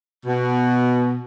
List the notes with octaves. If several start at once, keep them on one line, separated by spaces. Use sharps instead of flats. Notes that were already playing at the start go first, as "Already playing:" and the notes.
B2